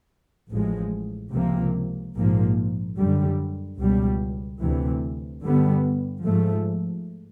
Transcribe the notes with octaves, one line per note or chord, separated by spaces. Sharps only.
A1 A2 F3 G#3
C#2 C3 F3 A#3
A#1 G#2 F3 A#3
F#2 D3 G3
C#2 B2 G3
D2 C3 E3
G2 D3 G3 B3
G#2 F3 A3